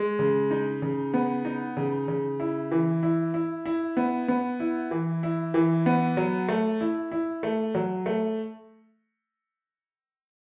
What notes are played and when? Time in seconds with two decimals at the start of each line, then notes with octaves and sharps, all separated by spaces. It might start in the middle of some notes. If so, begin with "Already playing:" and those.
Already playing: G#3
0.19 C#3
0.51 D#4
0.82 C#3
1.14 B3
1.45 D#4
1.77 C#3
2.08 C#3
2.40 E4
2.71 E3
3.03 E4
3.34 E4
3.66 E4
3.97 B3
4.28 B3
4.60 E4
4.91 E3
5.23 E4
5.54 E3
5.86 B3
6.17 F#3
6.48 A3
6.80 E4
7.12 E4
7.43 A3
7.75 F#3
8.06 A3